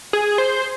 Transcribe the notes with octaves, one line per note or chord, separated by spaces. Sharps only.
G#4
C5